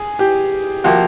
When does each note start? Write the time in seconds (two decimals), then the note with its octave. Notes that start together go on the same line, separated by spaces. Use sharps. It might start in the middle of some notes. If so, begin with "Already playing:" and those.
Already playing: G#4
0.19 G4
0.84 C3 F3 A#3 F#4